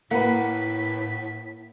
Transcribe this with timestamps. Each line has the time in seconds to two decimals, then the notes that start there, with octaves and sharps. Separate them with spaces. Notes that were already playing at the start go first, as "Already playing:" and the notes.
0.11 A2 A#3 B4 F#5 B6